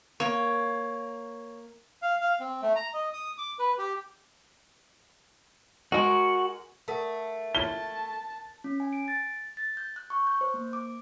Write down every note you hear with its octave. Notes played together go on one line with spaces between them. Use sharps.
A#3 C#5
F5
F5
C4
A3
A#5
D#5
D#6
D6
B4
G4
G#3 F#4 A#4
A3 A4 A#4 F#5
A5 G7
C#4
G#5
D7
A6
A6
G6
F#6
C#6
G6
C5
A#3
D6